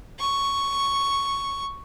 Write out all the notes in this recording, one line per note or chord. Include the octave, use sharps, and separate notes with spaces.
C#6